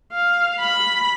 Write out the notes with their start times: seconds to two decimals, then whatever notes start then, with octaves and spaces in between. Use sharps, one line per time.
0.12 F5
0.60 B5